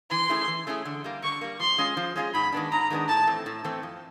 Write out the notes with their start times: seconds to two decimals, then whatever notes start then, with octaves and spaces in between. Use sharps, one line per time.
0.10 E3 C6
0.29 A3 C#4 E4 G#4
0.47 E3
0.67 A3 C#4 E4 G#4
0.85 D3
1.04 G3 A#3
1.23 D3 C#6
1.41 G3 A#3
1.60 F3 C6
1.78 G#3 C#4 F4 G#4
1.97 F3
2.16 G#3 C#4 F4 G#4
2.34 G#2 B5
2.52 D#3 G#3 B3 D4
2.72 G#2 A#5
2.90 D#3 G#3 B3 D4
3.08 A2 A5
3.27 E3 A3 C4
3.46 A2
3.64 E3 A3 C4
3.83 F2